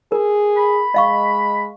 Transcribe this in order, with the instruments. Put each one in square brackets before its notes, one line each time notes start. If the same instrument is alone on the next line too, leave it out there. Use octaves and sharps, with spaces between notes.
[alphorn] G#4 [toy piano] A#4
[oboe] B5
[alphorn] G#3 [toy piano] D#5 F5 C#6